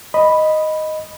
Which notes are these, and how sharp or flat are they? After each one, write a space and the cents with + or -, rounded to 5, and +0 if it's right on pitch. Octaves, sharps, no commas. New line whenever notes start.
D#5 +0 B5 +0